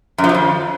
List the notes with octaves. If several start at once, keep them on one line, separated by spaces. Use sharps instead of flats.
F#2
F3
F#3
F2